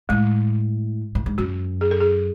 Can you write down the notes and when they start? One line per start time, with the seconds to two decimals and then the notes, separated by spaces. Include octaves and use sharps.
0.09 A2 G#3
1.15 A2
1.26 G#2
1.38 F#2 F#4
1.81 G#4
1.91 A4
2.00 G#4